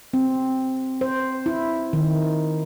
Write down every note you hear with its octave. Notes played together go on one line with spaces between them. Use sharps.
C4
C5
E4
D#3